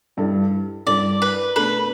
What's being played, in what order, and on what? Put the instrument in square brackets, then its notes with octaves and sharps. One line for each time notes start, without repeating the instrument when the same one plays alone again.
[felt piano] G2 G3 E4 A4
[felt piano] G2 G3 E4 A4 [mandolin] D5
[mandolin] B4
[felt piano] B2 A3 D4 A4 [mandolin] B4